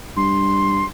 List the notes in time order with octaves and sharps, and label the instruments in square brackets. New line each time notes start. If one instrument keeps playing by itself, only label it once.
[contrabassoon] G2 [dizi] C6